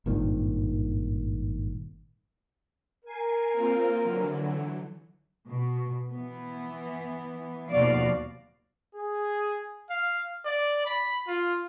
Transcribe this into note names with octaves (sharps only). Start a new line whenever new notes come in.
G#1 G2 A#2 D#3
A#4 G#5 C7
A#3 C4 F4
D3 E3 F#3
B2
E3 B3
D#2 B2 F3 F#4 D5 F5
G#4
F5
D5
B5
F4